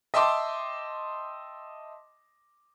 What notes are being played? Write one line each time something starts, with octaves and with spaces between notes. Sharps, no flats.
D#5 E5 G5 A5 C6 D6